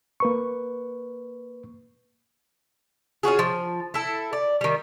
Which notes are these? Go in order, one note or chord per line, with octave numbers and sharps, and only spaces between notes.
A#3 B4 C#6
C#4 F4 F#4 G#4
F3
E4 A4
D5
D#3 G3